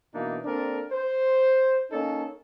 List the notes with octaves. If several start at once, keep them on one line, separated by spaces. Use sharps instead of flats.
B2 E3 A#3 D4 D#4
A#3 C4 D4 A4 A#4
C5
A#3 C#4 D#4 A4